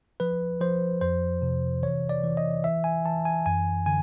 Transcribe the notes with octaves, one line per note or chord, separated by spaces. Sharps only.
F3 B4
F3 C5
F2 C5
C3
E3 C#5
D5
E3
D#5
E3 E5
G#5
E3 A5
G#5
F#2 G#5
D3 G#5